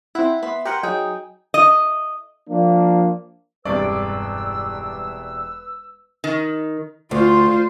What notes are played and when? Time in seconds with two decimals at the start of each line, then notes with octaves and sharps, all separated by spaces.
0.15 C4 E4 F#5
0.43 B3 E5 B5 C6
0.65 G4 A#4 C5 F#5 G#5
0.83 F#3 D#4 G#4 G5
1.54 D#5
2.49 F3 A#3 D4
3.65 E1 G2 C3 B4 D5 A5 D6 E6
6.24 D#3
7.11 D2 F4 C5